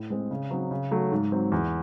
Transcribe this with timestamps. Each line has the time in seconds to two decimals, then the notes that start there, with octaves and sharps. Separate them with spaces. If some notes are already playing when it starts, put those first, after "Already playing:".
Already playing: A2
0.10 G#3 C4
0.31 C#3
0.50 F#3 C4 D#4
0.71 C#3
0.91 F#3 A3
1.11 G#2
1.32 F#3 C4
1.52 E2